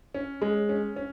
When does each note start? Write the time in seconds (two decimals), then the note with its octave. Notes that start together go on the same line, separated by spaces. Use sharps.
0.15 C#4
0.42 G#3
0.69 C#4
0.96 C#4